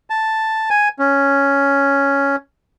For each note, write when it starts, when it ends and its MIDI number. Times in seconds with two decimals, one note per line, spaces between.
0.10 0.69 81
0.70 0.89 80
0.99 2.36 61